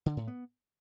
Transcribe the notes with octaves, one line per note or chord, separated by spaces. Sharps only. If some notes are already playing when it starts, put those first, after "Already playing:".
D3
A2
B3